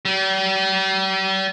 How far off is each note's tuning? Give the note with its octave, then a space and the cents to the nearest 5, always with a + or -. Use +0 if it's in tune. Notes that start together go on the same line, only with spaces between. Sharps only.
G3 -40